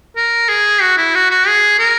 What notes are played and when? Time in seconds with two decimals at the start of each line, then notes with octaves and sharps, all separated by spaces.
0.17 A#4
0.49 G#4
0.82 F#4
0.98 E4
1.15 F#4
1.31 F#4
1.47 G#4
1.79 A#4